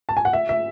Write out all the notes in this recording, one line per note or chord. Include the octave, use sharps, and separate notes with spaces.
A5
G#5
F#5
E5
E5